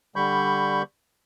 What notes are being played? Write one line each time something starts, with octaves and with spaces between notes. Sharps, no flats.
D3 G3 B5 C#6 G6